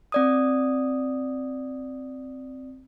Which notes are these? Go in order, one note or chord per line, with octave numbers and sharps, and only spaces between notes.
C4 D5 D#6